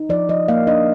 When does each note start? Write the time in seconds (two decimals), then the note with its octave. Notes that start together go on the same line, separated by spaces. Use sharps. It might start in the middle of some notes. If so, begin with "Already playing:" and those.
Already playing: D#4
0.09 F3 D5
0.29 F3 D#5
0.48 A#3 F5
0.67 D4 D#5